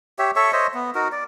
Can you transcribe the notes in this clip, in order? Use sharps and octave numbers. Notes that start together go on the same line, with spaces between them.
G4 C#5 E5
A4 C#5 E5 C#6
C5 C#5 D#5 E5
B3
D#4 F#4 A#4
D5